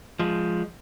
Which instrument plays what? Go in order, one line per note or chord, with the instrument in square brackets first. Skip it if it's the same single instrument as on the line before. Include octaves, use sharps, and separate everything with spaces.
[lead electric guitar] F3 G#3